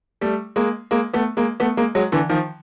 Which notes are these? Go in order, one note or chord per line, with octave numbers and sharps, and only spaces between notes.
G3 A3
G#3 A#3
G#3 A#3
A3 B3
G#3 A#3
A3 B3
G#3 A#3
F#3 G#3
D3 E3
D#3 F3